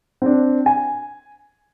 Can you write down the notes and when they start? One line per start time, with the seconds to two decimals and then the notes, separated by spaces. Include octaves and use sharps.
0.22 C4 D4
0.66 G#5